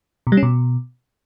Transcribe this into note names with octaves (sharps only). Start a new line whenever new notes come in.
B2
G3
C#4
B2